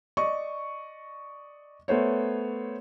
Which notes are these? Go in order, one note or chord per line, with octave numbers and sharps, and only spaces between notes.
D5 D#5 C#6
A3 B3 C5 C#5